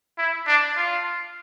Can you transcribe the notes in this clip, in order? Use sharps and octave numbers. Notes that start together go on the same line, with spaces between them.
E4
D4
F4